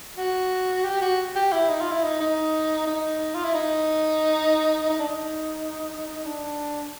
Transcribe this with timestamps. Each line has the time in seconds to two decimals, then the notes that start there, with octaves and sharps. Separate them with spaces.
0.17 F#4
0.84 G4
1.01 F#4
1.35 G4
1.52 E4
1.69 D#4
1.81 F4
1.91 E4
2.03 D#4
2.20 D#4
2.87 D#4
3.35 F4
3.44 E4
3.54 D#4
4.89 D#4
4.99 D4
5.09 D#4
6.25 D4